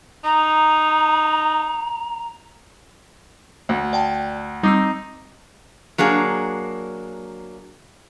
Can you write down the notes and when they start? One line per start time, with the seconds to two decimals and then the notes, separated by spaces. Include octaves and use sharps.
0.24 D#4 A#5
3.69 D2
3.93 D5 G5 A5
4.63 G3 C4 D#4 E6
5.98 F#3 A#3 D4 G#4